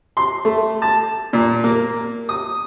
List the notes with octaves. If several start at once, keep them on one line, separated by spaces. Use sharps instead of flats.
C6
A3
A5
A#2
A#3
D#6